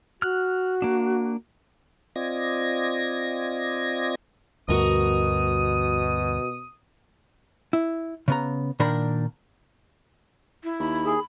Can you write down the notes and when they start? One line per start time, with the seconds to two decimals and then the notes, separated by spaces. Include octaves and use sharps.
0.22 F#4 F6 F#6
0.82 A#3 D4
2.16 C4 F4 D5 D#5 G#6 A#6
4.69 D2 G2 B2 F#4 A#4 D#5 D#6
7.73 E4
8.28 C#3 B3 A#5
8.80 A#2 D#3 D4 A#4 B5
10.64 E4
10.79 D#2 B5
11.06 G#4